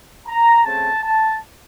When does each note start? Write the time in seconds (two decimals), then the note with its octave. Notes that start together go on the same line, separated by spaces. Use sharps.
0.27 A#5
0.65 C#3 A3 C4 A5
1.03 A5